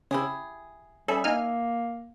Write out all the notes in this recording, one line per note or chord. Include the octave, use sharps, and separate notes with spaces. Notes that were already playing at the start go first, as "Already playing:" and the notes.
C#3 E4 G4 G#4
G3 C#4 G#4 A4 E5
A#3 D#4 G#5 F6